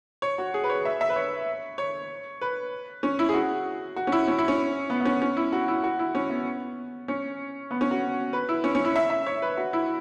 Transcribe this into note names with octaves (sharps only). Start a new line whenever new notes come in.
C#5
F#4
G#4
B4
C#5
E5
E5
B4
C#5
C#5
B4
C#4
E4
G#4
F#4
F#4
C#4
E4
C#4
E4
C#4
B3
B3
C#4
C#4
E4
F#4
E4
F#4
E4
C#4
B3
C#4
B3
C#4
F#4
B4
E4
C#4
C#4
E4
E5
E5
C#5
B4
F#4
E4